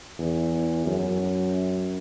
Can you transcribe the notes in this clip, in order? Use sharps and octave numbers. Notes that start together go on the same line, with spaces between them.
E2
F#2